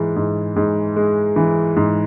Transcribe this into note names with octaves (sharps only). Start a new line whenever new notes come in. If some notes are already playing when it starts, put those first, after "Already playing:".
Already playing: G#2 E3 G#3
G#2
G#2
G#3
E3
G#2